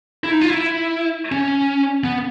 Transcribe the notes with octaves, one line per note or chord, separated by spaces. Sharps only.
E4
D#4
F4
E4
C#4
B3